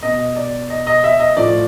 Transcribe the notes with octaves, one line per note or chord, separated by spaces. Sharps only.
B2 D#5
D5
D#5
D#5
E5
D#5
A2 F3 D5